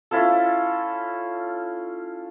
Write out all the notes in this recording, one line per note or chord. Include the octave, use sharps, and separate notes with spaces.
C#4 E4 F4 A4